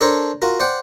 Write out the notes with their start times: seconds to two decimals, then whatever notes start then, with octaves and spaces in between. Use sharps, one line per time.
0.01 D4 A4 A#4 C5 C#5 A#5
0.42 F4 F#4 A#4
0.60 C5 D5 F#5 G5